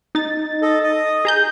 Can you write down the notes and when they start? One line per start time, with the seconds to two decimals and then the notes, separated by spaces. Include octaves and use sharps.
0.15 D#4 A6
0.62 A4 D#5
0.84 D#5 D#6
1.25 G#4 A#5 G6